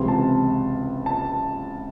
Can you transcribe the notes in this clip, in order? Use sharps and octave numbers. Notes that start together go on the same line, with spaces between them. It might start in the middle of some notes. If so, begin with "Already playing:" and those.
Already playing: C#2 C3 E3 C4 C6
A5
A5